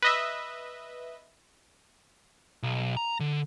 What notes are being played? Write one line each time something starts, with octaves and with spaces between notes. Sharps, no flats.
B4 D#5 E5
B1
A#5
D3